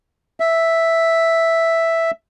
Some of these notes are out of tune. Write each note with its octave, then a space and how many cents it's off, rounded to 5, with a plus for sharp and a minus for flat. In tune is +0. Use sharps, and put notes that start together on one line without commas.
E5 +0